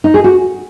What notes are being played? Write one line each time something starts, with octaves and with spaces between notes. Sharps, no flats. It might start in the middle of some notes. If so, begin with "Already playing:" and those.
D#4
G#4
F#4